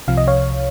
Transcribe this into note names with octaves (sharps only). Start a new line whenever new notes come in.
C2 C3 F3 F5
D#5
C#5 F5